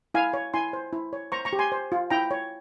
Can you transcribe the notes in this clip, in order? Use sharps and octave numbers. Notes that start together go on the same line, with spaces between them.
E4 F5 G#5
C#5
E4 G#5 C6
C5
E4
C#5
C5 A#5 C#6
A#5 C#6
G4
G#5 C6
C5
F4
E4 G5 A#5
C#5